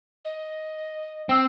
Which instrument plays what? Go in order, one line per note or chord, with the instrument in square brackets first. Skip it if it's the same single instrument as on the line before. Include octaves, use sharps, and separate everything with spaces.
[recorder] D#5
[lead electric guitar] C4 [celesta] G5 E6